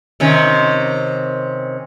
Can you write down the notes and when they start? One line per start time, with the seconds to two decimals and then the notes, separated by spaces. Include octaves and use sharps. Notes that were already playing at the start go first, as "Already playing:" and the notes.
0.20 C3 D#3 C#4